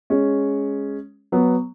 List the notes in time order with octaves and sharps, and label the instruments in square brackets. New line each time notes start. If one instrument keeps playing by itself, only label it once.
[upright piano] G#3 C#4
F#3 B3